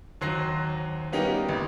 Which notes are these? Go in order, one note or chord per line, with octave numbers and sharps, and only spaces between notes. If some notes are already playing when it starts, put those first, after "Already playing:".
D#2 F#3 C5 F#6 A#6 C7
G3 A#3 B3 C#4 D#4 G4
A1